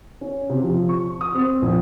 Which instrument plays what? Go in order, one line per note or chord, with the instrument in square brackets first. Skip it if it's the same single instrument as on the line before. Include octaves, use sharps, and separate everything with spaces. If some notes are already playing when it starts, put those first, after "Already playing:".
[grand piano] C#4
C3
F3
C#6
D#6
C4
A#1